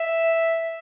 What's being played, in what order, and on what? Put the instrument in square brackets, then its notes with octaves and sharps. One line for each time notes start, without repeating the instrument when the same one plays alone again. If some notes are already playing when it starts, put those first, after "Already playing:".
Already playing: [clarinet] E5